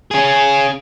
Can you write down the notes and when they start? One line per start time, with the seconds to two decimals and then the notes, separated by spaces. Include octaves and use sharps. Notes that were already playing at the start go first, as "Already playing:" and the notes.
0.11 C#4 G#4